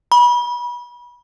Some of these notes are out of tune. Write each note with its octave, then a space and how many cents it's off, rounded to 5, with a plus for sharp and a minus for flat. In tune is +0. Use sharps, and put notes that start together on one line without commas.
B5 -30